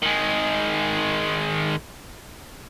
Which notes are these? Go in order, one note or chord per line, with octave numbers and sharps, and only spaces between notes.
D#3 G#3